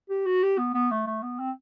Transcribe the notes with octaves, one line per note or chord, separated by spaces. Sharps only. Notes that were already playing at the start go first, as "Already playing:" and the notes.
G4
F#4
G4
B3
B3
A3
A3
B3
C4